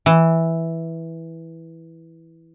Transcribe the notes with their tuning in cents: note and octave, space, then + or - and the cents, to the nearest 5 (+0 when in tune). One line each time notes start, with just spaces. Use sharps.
E3 -5